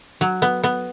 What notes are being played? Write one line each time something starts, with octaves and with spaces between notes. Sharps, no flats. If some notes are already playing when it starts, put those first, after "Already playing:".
F#3
B3
B3